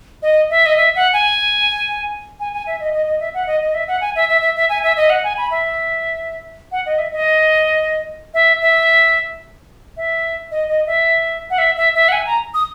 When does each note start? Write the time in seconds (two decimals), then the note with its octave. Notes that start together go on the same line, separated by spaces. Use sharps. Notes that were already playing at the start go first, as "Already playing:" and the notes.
0.22 D#5
0.50 E5
0.66 D#5
0.77 E5
0.95 F#5
1.13 G#5
2.40 G#5
2.53 G#5
2.66 E5
2.80 D#5
2.94 D#5
3.07 D#5
3.20 E5
3.34 F#5
3.47 D#5
3.61 D#5
3.74 E5
3.88 F#5
4.01 G#5
4.16 E5
4.29 E5
4.41 E5
4.56 E5
4.69 G#5
4.83 E5
4.97 D#5
5.10 F#5
5.24 G#5
5.37 B5
5.51 E5
6.72 F#5
6.86 D#5
6.98 E5
7.12 D#5
8.34 E5
8.61 E5
9.97 E5
10.51 D#5
10.68 D#5
10.87 E5
11.50 F#5
11.58 E5
11.76 E5
11.94 E5
12.08 F#5
12.12 G#5
12.26 A#5
12.54 D#6